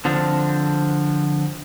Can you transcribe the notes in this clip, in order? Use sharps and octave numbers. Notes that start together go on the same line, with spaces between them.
D3 F3 C4 D4